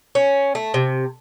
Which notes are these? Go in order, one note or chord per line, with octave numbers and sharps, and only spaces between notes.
C#4
A3
C3